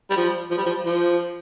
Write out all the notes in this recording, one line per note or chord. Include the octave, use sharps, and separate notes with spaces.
G3
F3
F3
G3
F3
F3